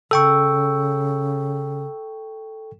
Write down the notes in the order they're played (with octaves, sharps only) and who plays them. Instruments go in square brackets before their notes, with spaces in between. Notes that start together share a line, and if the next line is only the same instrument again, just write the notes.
[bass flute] C#3 [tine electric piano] A4 G5 C#6 [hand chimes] E6